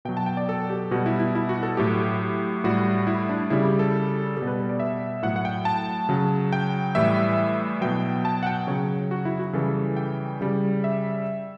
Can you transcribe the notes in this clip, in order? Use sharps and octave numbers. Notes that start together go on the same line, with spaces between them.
B2 F#3 G5
A5
G5
D5
A4
G4
B2 G3 F#4
E4
E4
E4
F#4
A4
A2 F#3 G4
A2 G3 F#4
E4
D4
C#3 G3 E4
G4
A4
B2 G3 A4
B4
D5
E5
A2 F#3 F#5
F#5
G5
A5
C#3 F#3
G5
A2 E3 G3 E5
B2 F#3 G5
A5
F#5
G5
C#3 F#3 C#5
F#4
E4
F#4
C#3 E3 G3 A4
G5
C#3 G3
E5